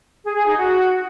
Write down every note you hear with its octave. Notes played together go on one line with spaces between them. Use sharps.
G#4
G#4
D#4
F#4